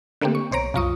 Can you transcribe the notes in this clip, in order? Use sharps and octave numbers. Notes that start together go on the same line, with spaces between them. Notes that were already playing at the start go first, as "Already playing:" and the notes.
D3 A3 A#3 C4 G4
C#6
B1 C5 C#5 A#5 D7
C2 F#2 F4 A#5 C#6 D#6